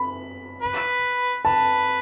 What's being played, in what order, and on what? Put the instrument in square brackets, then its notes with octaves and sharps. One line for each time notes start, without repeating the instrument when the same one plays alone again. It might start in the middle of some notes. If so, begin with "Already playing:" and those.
Already playing: [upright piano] B5
[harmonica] B4
[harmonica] B4 [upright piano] A5